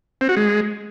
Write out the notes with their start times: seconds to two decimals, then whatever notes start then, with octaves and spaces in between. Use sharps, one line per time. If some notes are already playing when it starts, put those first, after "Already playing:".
0.21 C4
0.29 F#4
0.37 G#3